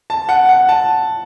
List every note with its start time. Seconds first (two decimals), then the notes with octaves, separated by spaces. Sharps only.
0.10 A5
0.29 F#5
0.49 F#5
0.69 A5